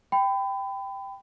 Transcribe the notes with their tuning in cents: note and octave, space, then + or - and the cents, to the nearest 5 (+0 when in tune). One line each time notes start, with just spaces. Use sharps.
G5 +0 B5 +30